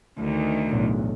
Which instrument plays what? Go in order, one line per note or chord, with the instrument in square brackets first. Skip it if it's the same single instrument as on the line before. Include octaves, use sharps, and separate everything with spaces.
[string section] D2 D#3
[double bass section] B1 E2 A2